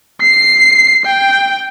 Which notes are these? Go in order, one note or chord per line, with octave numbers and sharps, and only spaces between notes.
C7
G5